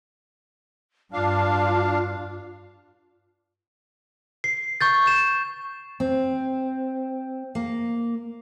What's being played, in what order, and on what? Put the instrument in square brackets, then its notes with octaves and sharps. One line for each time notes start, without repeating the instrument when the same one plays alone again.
[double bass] G2 [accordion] D4 F5 [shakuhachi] F4
[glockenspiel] C7
C#6 G6 A6
G6 E7
[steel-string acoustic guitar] C4
A#3